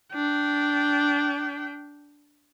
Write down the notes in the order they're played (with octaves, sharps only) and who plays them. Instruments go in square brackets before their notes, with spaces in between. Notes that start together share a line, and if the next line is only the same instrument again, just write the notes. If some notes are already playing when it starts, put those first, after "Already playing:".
[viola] D4 G5